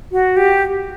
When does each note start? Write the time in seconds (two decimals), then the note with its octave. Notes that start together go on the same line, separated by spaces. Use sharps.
0.12 F#4
0.37 G4